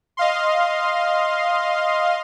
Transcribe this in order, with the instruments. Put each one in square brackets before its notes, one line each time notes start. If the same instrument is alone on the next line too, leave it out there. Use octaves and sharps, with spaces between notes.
[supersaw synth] D#5 F5 C6